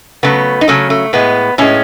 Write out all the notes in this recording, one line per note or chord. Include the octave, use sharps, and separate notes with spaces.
C#3 F#3 A3 B3
D#4
C#3 F#3 A3 C#4
A3
A2 G#3 B3
A2 G#3 C#4